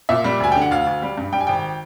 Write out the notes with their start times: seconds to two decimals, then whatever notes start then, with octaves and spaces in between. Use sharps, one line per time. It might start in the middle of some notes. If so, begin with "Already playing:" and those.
0.09 A#2 E5
0.24 G3
0.40 D2 G#5
0.52 D3 G5
0.62 F#5
0.71 D2 F5
0.87 D2
1.02 G3
1.18 G2
1.33 G3 G5
1.40 G#5
1.47 G#1 G5